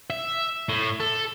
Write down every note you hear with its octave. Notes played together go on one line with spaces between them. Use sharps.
E5
A2
A4